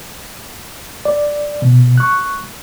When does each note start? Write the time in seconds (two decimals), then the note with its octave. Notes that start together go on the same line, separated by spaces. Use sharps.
1.05 D5
1.62 B2
1.98 C#6 F#6